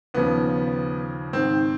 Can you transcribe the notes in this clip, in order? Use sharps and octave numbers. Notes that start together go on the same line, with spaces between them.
D#2 C#3 F3 B3
G#2 D#3 C4